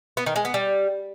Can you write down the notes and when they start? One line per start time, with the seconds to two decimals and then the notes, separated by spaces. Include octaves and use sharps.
0.17 B3
0.26 D#3
0.36 G#3
0.45 B3
0.54 G3